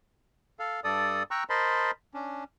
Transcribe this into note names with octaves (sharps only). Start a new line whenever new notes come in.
A4 F5
G2 A4 D5 D#6
G5 A#5 C#6 E6 F#6
A#4 C5 D#5 A5 B5 C6
C#4 D4